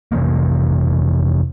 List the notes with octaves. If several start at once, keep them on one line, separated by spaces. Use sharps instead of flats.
F2 C3 E3 A#3